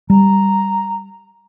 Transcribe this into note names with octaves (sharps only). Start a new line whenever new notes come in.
G3 A#5